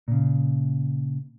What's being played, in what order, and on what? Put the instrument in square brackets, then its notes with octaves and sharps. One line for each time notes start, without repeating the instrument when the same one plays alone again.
[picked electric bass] A#2 C#3